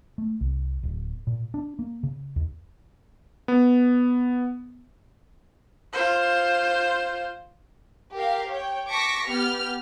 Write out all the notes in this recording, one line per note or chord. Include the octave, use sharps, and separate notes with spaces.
A3
C2
D1
A#2
D4
A#3
C#3
D#2
B3
F4 C5
G4 A#4 F5
C#5 G5
A5 C#6 D6 A#6 B6 C#7
B3 G4 F6